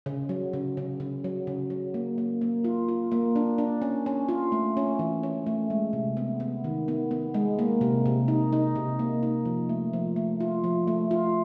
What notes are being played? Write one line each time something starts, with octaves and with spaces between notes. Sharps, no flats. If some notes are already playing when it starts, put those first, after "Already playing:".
C#3
F#3
C#3
C#3
C#3
F#3
C#3
F#3
A#3
A#3
A#3
F4
F4
A#3
D4
D4
C#4
C#4
F4
A3
C#4
E3
C#4
A3
G#3
C3
B3
B3
D#3
B3
B3
G#3
A#3
C3
C3
D#4
D#4
C3
A#3
D#4
F3
A3
F3
A3
F4
F3
A3
F4